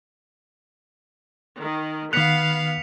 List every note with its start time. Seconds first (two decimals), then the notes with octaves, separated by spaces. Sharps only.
1.60 D#3
2.13 D#3 B3 F5 F#6 B6 C#7 F7